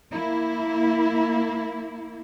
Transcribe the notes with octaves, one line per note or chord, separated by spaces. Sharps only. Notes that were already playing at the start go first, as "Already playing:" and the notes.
A#3 E4